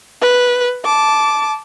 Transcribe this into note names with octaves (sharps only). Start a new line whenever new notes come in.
B4
A5 D6